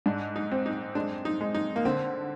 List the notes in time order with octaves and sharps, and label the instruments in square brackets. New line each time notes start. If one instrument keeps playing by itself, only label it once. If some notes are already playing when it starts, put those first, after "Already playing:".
[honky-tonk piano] G#2 [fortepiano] D4
[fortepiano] D#4
[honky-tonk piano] C4
[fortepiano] D#4
[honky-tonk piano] G#3 [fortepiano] D4
[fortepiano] D#4
[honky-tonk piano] G#3
[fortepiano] D#4
A#3
[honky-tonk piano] D3 [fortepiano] C4